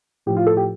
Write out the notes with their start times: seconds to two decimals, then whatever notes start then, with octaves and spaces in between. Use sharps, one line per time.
0.26 A2 F3 G4
0.37 F4
0.46 A4
0.57 G4